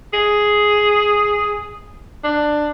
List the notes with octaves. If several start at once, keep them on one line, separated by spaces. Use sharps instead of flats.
G#4
D4